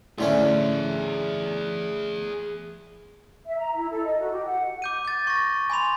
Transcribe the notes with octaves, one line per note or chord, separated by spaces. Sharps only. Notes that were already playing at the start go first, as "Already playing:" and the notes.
A2 D3 C#4 G#4 E5
E5
A#5
E4
A4
D#5
F#4
G4
F#5
D6 G6 D#7
G6 A6
C#6 A#6
G#5 B5 C6 F7